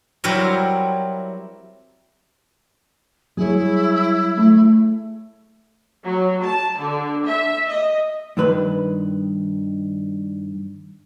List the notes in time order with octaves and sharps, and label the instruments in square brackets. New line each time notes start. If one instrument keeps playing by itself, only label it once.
[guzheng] F#3 G3 C4 E4 A#4 C#5
[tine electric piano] F#3 G3 [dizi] E4 [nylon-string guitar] G#4 C#5
[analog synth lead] A3
[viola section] F#3
A5
D3
E5
D#5
[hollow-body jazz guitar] G2 D#3 B4 B5